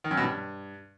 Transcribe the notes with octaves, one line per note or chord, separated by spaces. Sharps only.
D#3
F#2
B2
G2